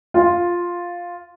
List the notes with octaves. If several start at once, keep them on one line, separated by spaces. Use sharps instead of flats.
F4